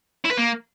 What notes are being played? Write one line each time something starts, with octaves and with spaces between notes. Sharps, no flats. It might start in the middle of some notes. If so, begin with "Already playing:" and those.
E4
B4
A#3